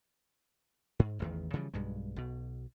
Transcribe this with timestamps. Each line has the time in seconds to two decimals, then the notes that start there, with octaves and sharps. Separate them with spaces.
0.99 G#2
1.20 A1 E2 D#3
1.53 C#3 E3 F3 G3
1.74 B1 G2 G#3
2.16 B1 B2